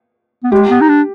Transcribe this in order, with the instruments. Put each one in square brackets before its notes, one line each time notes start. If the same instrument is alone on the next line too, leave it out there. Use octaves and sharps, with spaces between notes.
[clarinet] B3
[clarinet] G#3 [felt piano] G4
[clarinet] B3
D#4
D4